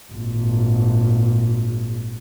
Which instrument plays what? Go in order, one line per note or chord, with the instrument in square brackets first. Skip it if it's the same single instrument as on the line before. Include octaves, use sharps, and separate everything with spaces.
[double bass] G#1 A#2